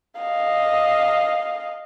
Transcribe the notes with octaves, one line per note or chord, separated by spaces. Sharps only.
D#5 F5